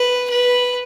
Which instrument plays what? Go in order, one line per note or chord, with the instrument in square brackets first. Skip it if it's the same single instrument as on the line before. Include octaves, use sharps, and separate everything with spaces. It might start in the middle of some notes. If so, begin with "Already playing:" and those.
Already playing: [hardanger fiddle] B4
B4